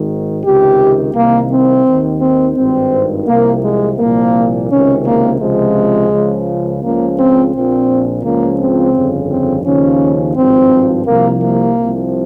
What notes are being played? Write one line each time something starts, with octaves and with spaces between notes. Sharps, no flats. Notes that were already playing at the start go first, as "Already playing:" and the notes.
Already playing: G#1 G#2 D#3
C#2 C3 D#3 G4
C2 C3 D#3 A#3
C4
D#2 D#3
C4
G#1 G2 D#3 C4
C2 C3 F3 A#3
G#3
C2 A#2 F3 A#3
C#2 C3 D#3 C#4
A#3
C#2 C3 F3 G#3
C#2 C#3 F3
C#2 C#3 F3 A#3
C4
A#1 A#2 F3 C4
C#2 C#3 F3 A#3
C4
G1 F2 C#3
C4
D#2 C#3 F3 C#4
G#1 G2 F3 C4
C2 C3 F3 A#3
A#3
C2 C3 F3